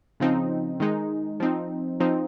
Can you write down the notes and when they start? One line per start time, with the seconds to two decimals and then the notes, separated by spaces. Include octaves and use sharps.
0.20 C#3 F3 C4 D#4
0.80 D#3 G#3 D#4
1.40 F3 C4 D#4
2.00 F3 C4 D#4